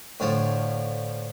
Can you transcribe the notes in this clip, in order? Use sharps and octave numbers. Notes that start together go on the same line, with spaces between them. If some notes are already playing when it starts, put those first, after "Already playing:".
A2 D3 F3 C#5 A5